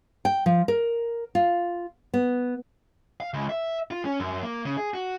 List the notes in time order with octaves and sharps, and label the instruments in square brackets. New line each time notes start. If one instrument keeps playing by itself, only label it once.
[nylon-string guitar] G5
F3
A#4
F4
B3
[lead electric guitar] F5
C#2
E5
F4
C#4
F#2
A#3
C#3
G#4
F#4